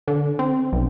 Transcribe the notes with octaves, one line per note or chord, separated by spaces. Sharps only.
D3
C4
B1